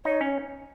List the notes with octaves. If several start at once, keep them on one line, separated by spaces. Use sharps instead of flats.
D#4 C#5
C#4